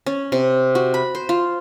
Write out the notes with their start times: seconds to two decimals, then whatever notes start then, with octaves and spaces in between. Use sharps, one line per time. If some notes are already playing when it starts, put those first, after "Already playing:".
0.06 C#4
0.32 C3
0.75 F#4
0.94 B5
1.15 C5
1.29 F4